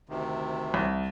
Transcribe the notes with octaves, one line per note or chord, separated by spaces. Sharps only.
D2 C3 D#3
C2